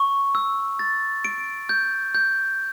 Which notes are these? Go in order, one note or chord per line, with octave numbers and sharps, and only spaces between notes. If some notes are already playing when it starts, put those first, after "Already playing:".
Already playing: C#6
E6
A6
D7
G6
G6